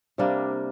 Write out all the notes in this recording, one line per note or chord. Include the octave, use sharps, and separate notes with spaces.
C3 G3 A#3 D4